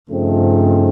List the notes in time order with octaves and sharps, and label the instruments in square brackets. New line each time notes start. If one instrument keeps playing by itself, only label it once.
[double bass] G2 [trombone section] C#3 F3 A3 C4 D#4